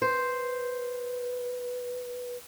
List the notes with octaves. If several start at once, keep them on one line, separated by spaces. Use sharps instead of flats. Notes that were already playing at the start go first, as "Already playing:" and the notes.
B4 C5